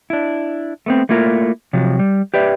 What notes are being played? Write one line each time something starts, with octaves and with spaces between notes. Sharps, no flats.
D4 E4
A3 B3 C4
A3 A#3 E4 F4 A#4
C3 F3 F#3
G3
G4 B4 D5 E5